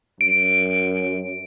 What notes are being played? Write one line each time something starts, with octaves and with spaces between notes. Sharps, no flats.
F#2 D7